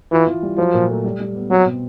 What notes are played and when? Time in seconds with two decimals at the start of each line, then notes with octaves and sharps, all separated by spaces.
0.12 E3 F4
0.27 E3
0.43 G3
0.58 F3 F#3
0.74 A#2
0.89 A3
1.04 G3
1.20 G3
1.35 B3
1.51 F#3 C4
1.66 B2